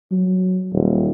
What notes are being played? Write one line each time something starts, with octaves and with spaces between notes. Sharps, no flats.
F#3
D#1